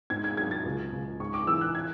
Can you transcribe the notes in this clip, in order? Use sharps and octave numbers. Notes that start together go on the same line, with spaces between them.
G#2 G#6
G#6
F#3 G#6
A6
C#2
C#2
G#2 C#6
D6
E3 E6
F#6
G#6